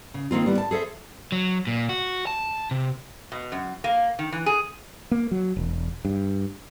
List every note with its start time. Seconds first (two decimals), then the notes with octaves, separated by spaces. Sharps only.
0.14 C#3
0.31 D#3 A#3 C4 F4
0.46 G3 B3 E4
0.58 A5
0.71 G#4 A4 C5 E5
1.32 F#3
1.67 A#2
1.89 F#4
2.27 A5
2.71 C3
3.32 B2
3.52 F#2
3.84 A#3
4.19 D#3
4.32 E3
4.46 G#4
5.11 A#3
5.31 F#3
5.57 E1
6.05 G2